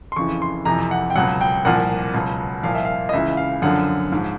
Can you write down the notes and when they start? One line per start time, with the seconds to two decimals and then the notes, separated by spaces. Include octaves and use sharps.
0.12 C6
0.16 F2 C#3 E3 C#6
0.42 C6
0.65 F2 C3 E3 A#5
0.91 F#5
1.10 G5
1.16 C#2 B2 F#3 F#5
1.41 G5
1.65 C2 A#2 F3 F#5
2.14 C#2 B2 F#3
2.63 C2 A#2 F3 F5
2.75 E5
2.85 F5
3.09 D#5
3.13 C#2 C#3 E3 E5
3.37 F5
3.62 F#2 D3 F3 F#5
4.12 G#2 F3